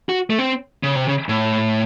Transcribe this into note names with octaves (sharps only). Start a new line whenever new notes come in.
F#4
A3
C4
C#3
C3
C#3
A2